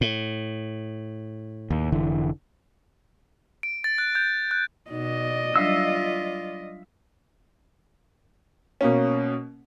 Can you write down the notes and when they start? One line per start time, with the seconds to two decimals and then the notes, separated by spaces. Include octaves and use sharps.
0.01 A2
1.70 D#2
1.92 F1 D3 E3
3.63 D7
3.84 A6
3.98 F#6
4.15 G6
4.51 F#6
4.91 B2 D#4 D5 D#5
5.56 F#3 G3 D4 F4 E5 F5 E6
8.81 B2 A#3 C#4